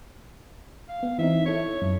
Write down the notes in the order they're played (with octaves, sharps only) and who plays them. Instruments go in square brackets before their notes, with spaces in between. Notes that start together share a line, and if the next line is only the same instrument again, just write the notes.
[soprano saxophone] F5
[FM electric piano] B3
[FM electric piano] E3 C4 D#4 [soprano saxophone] E5
[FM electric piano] E4 A4 [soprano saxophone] C#5
[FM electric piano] F#2